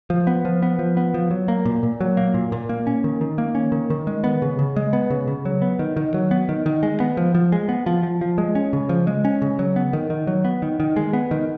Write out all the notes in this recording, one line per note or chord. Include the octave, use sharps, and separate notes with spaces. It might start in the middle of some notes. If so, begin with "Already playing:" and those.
F3
B3
F3
B3
F3
B3
F3
F#3
A#3
A#2
A#2
F#3
A#3
A#2
A#2
A#3
C#4
D#3
D#3
A#3
C#4
D#3
D#3
G#3
B3
C#3
C#3
G#3
B3
C#3
C#3
F#3
B3
D#3
D#3
F#3
B3
D#3
D#3
G#3
B3
F3
F3
G#3
B3
F3
F3
F3
G#3
C#4
C#3
F3
G#3
C#4
C#3
F#3
B3
D#3
D#3
F#3
B3
D#3
D#3
G#3
B3
D#3